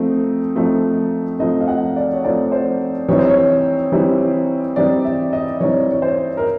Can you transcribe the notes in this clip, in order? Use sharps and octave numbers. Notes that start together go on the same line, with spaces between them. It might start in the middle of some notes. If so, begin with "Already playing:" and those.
Already playing: F3 A3 C4 D#4
F3 A3 C4 D#4
F3 A3 C4 D#4 D#5
F5
F#5
D5
C#5
F3 A3 C4 D#4 D5
C5
E3 G3 C4 D#4 C#5
C5
C#5
E3 G3 C4 D#4
E3 G3 C4 D#4 D5
E5
D#5
E3 G3 C4 D#4 C#5
C#5
C5
A#4